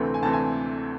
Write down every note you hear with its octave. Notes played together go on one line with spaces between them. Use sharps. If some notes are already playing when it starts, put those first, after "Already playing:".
Already playing: D2 C3 E3 A3 C4
G#5
D2 C3 E3 A3 C4 A5
G#5